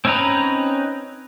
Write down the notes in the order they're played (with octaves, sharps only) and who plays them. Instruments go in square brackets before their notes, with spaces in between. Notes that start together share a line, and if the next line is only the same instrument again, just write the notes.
[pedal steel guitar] C4 C#4 D#4 B4 A#5